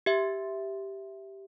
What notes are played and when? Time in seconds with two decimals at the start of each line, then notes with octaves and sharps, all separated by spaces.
0.06 G4 E5